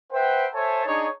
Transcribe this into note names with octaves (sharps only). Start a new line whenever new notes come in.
B4 C5 E5 F#5 G5
A4 C5 C#5 E5 G#5 A5
D4 D#4 G#4 C#5